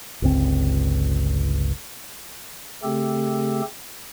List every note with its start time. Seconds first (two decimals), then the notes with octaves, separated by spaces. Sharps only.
0.22 G1 C#2 C4
2.83 C#3 A3 C4 G4 A4